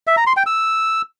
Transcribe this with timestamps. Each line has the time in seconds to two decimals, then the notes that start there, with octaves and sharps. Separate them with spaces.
0.07 E5
0.17 A#5
0.27 C6
0.37 G5
0.46 E6